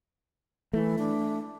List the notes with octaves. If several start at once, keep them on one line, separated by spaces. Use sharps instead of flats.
E3 A3
D4